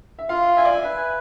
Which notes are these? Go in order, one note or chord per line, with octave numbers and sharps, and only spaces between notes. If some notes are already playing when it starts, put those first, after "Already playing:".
E5
F4 F5
E5 G#5
D5
E5
B4 E5